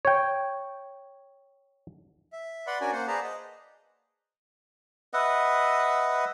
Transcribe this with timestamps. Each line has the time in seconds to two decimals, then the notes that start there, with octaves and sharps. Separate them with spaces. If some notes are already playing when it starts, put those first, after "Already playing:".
0.05 C#5 G5
2.33 E5
2.67 B4 D5 F#5 B5 C6
2.81 C#4 D4 F#4 A#4 D5 G#5
2.92 A#3 C5 F#5
3.07 G#4 B4 C5 D5 A5 A#5
3.24 D#5
5.13 B4 D#5 E5 F#5